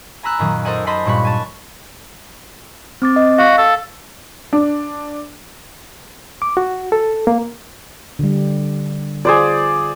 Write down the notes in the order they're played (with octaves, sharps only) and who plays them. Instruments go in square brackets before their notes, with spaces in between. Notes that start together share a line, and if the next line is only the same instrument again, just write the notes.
[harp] G#5 A#5 B5 E6 F#6
F#2 A#2 D#3 F#3 G#4
A4 A#4 C5 D#5 F#5 G#5
C5 D#5 G#5 A5 B5 C6
G2 A#2 C#5 B5 F#6
G#5 A5
[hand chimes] C4 D6 A6
D#5
[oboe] F#4 [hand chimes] F5
[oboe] A4
[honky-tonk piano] D4
[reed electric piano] D6
F#4
A4
A#3
[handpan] D3 G3
[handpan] F4 [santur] G#4 C5 D5